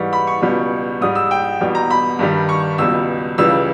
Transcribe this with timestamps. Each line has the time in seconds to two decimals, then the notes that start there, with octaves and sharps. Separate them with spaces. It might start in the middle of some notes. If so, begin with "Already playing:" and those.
Already playing: G#2 E3 G3 C#6
0.13 B5
0.27 C#6
0.42 C#2 B2 G3
1.01 G#2 G3 D#6
1.15 E6
1.31 G5
1.60 E2 B2 G3
1.75 A#5
1.90 B5
2.19 G2 D#3 G3
2.49 C#6
2.78 C#2 B2 G3 E6
3.38 C#2 C#3 E3 G3 E6